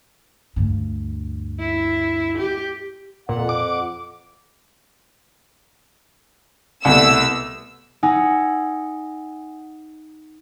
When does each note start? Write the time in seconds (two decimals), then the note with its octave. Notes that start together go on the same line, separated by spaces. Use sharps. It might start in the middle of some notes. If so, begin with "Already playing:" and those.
0.56 D2 G2
1.59 E4
2.37 G4
3.29 F2 A#2 F#5
3.49 D6
6.85 C2 B2 A3 E6
8.03 D#4 F#5 G#5 E6